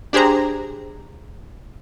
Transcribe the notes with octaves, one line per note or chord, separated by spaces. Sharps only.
D4 G4 G#4 C5 A#5